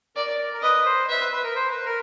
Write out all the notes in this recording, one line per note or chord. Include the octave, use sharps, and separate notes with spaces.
A#4 D5
A#4
B4 D#5
C5
B4 E5
B4
B4
A#4
C5
B4
A#4